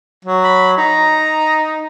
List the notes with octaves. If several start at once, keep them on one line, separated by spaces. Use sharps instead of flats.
F#3
B5
D#4 A#5